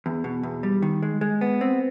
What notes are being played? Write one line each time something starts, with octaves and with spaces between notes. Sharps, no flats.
E2
B2
E2
G3
D#3
G#3
G#3
B3
C4